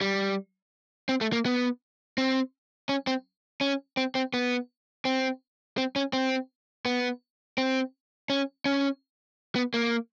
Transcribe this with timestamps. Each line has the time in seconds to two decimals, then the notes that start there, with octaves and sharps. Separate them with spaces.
0.01 G3
1.09 C4
1.21 A3
1.32 A#3
1.46 B3
2.18 C4
2.89 C#4
3.07 C4
3.61 C#4
3.97 C4
4.15 C4
4.34 B3
5.05 C4
5.78 C4
5.96 C#4
6.13 C4
6.85 B3
7.58 C4
8.30 C#4
8.65 C#4
9.56 B3
9.74 A#3